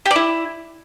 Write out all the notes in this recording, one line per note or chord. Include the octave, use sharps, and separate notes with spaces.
G4
D5
E4